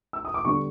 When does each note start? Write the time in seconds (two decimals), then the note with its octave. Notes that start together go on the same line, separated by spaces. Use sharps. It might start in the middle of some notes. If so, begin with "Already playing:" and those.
0.13 E6
0.25 D#6
0.34 D6
0.45 D3 G3 B3 C#6